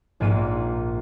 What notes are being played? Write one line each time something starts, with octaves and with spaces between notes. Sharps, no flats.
A#1 G#2 A#3 D#7